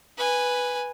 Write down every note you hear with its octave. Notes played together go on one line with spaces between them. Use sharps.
B4 G#5